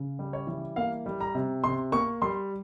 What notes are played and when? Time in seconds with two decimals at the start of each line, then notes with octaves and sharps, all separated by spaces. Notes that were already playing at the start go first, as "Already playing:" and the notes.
Already playing: C#3
0.19 G3
0.33 C#5
0.47 E3
0.76 A#3 F5
1.06 G3
1.21 A#5
1.35 C3
1.64 C3 C6
1.92 A#3 C#6
2.22 G3 C6